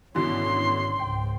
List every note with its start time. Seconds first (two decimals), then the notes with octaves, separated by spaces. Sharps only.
0.15 G#1 B2 D3 E3 C#4 C6
0.99 C#2 G#2 G5